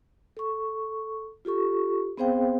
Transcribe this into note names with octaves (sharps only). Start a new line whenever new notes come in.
A4 C#6
F4 G4 A4 C#6
B3 C4 G#4 C5 F5 G5